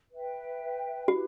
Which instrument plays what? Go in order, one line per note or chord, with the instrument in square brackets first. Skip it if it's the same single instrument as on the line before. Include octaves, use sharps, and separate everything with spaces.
[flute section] B4 E5 G5
[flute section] E4 G4 B4 [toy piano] F#4